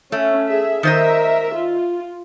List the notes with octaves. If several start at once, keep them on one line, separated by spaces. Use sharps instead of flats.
A3 C#4
G#4 E5
D#3 A#4 C5 D#5 E5
F4